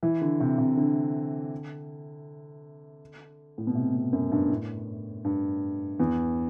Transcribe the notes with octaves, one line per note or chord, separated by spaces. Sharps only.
E3
D3
C3
C3
D3
A2
B2
C3
B2
F#2
G2
A2
G2
E2